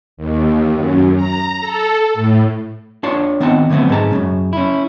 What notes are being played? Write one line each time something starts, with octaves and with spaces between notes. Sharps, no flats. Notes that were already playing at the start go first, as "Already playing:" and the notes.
D#2
F#2
A#5
A4
A2
D4 F4 C#5 A5
D#3 B3 C4 D#4 F#5 A5
D3 F#3 A3 B3 C4
G#2 G#4 A5 A#5
F#2 A2 C#3
C#4 E4